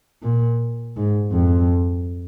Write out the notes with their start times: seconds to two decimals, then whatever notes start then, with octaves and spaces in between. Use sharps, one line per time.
0.23 A#2
0.96 G#2
1.32 F2